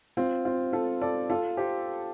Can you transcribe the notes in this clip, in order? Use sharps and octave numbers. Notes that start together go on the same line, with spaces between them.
C4 F4
C4 F4
F4 A4
A4 D5
F4 A4
G4 C5